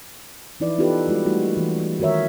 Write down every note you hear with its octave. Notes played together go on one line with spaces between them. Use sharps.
E3 F3 D#4 E4 B4 D5
B3 D#4 F4 G4 A4 B4
G3 G#3 F4 F#4
G3 A3 A#3 D#4 F#4
E3
D#3 F#4 A#4 C#5 E5